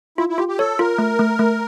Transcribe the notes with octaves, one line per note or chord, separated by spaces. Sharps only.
E4 F4
E4
F4 G4
G4
A4 C#5
F4 A#4
A3
A3
A3